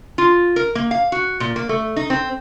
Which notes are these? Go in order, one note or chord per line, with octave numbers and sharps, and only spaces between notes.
F4
A#4
A#3
F5
F#4
A#2
A#3
A3
D#4
C4